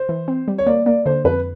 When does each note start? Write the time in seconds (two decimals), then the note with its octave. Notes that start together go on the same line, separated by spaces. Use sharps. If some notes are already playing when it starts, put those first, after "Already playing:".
Already playing: C5
0.09 E3
0.28 C4
0.48 G3
0.58 C#5
0.67 A#3 D5
0.86 A#3 D5
1.06 D3 C5
1.24 F2 B4